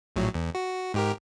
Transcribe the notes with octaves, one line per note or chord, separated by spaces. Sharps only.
A#1 A2 F#3
E2
F#4
G#2 G4 A#4